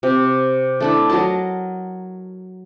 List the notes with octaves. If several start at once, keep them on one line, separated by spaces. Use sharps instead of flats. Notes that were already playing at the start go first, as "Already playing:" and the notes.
C3
A3 D4 E4
F#3 A#4 D#5 A5